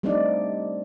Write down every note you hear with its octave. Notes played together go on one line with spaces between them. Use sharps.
G3 A3 C4 D4 D#4 D5